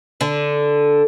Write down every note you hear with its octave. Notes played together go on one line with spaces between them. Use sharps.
D3